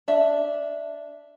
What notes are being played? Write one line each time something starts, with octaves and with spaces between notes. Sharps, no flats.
D4 E5